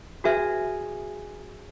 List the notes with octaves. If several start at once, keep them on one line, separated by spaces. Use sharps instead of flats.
C#4 F#4 G#4 B4 E5